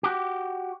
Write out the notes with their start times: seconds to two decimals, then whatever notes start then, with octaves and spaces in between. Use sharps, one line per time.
0.03 F#4 G4